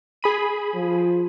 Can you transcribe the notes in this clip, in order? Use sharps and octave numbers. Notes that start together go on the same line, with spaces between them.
G#4 B5 D#7
F3